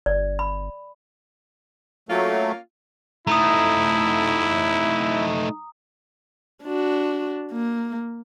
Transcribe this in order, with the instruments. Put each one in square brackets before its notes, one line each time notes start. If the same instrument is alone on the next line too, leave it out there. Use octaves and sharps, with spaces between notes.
[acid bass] G1 [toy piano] D5
[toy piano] B5
[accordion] F#3 A3 [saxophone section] A#3 C#4 F4
[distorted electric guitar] A3 D#4 [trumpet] E4 [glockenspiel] A#5 D#6
[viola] D4 F#4
A#3